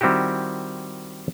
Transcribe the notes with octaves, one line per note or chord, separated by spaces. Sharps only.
D#3 G3 C4 E4 F#4 G4